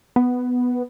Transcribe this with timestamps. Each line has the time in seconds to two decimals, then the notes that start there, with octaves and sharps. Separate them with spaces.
0.16 B3